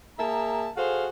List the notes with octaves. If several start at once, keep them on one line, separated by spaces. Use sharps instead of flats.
A#3 G#4 E5 A5 A#5
F#4 G#4 A4 C5 F5